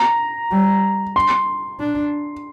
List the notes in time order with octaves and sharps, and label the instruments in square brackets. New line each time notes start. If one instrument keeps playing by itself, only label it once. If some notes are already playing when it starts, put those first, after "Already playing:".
Already playing: [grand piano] A#5
[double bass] G3
[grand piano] C6
[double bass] D4